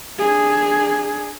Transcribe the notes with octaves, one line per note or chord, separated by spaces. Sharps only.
D4 G#4